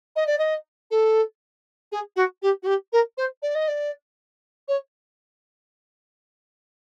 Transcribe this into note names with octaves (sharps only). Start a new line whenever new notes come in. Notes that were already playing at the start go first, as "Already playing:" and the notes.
D#5
D5
D#5
A4
G#4
F#4
G4
F#4
G4
A#4
C5
D5
D#5
D5
C#5